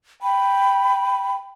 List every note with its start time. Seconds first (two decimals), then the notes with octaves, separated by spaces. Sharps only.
0.23 G5 B5